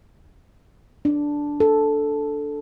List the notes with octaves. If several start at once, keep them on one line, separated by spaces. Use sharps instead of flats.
D4
A4